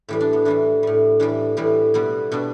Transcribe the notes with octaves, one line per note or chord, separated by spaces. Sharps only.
A2 E3 G3 G4
D4
B3
A2 E3 G3 D4
A2 G3
A2 E3 G3 D4
A2 E3 G3 G4
B2 G3 B3
B2 G3 D4